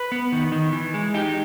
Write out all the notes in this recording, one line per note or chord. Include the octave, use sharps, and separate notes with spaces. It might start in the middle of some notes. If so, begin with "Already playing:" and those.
Already playing: B4
B3
D#3
D#3
E3
G#3
D#4 G4